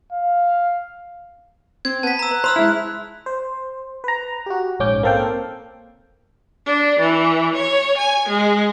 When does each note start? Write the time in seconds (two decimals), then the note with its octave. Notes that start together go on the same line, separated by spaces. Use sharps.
0.13 F5
1.85 C4 G#6
2.03 B3 A5 B6
2.19 A#5 E6
2.31 F#6
2.44 C5 B5 E6 F6
2.56 G#3 E4
3.26 C5
4.04 B4 A#5
4.46 F#4 G4
4.80 A#1 G#2 C#4 D6 G6
5.03 A#3 C4 A4 F5 G5
6.66 D4
6.99 E3
7.55 C#5
7.98 G#5
8.29 G#3